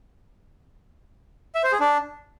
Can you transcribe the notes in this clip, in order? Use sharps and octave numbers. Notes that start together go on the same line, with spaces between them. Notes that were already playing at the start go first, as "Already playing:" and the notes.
E5
C5
G#4
D4